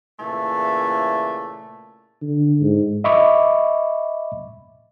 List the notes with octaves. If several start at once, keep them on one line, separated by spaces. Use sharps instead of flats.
A#2 C#3 E3 A3
D3
G#2
D#5 E5 B5 C#6 D6